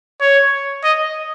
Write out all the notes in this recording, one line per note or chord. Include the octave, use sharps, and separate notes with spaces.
C#5
D#5